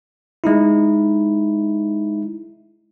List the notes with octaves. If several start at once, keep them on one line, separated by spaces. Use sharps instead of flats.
G#3 D#4 E4